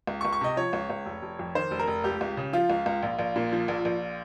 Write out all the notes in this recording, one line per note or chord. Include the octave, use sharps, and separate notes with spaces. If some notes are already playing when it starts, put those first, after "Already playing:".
C#2
C#6
C#2
C#6
C3 D#5
F3 C#5
C#2
C#2
F1
F1
F2
D#3 C5
F1
A#4
F1
C#2 G4
C#2
C#3
F3 F4
C#2
C#2
A#1
A#1
A#2
F3
A#1
A#1